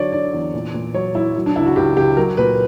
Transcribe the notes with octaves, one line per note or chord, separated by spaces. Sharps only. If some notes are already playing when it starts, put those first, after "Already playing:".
Already playing: D3 F#3 C#5 D5
D3 D5
E2
A#2
A#2
F#3 C#5
F#3 E4
F#3
D4
C#2 E4
F#4
C#2 G4
C#2 G4
F#3 A#4
A#2 B4